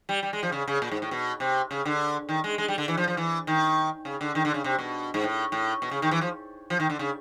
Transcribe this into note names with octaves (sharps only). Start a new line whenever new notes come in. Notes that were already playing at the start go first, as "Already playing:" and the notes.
G3
G3
G#3
F3
C#3
C#3
A#2
G#2
A2
B2
C3
C#3
D3
D#3
G#3
G#3
G3
D3
E3
F3
F3
E3
D#3
C#3
D3
D#3
D3
C#3
C3
B2
G#2
A2
A2
B2
C#3
D#3
E3
F3
F3
D#3
D3
C#3